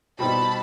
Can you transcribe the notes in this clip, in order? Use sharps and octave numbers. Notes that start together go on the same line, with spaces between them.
B2 G3 C4 D#4 A5 B5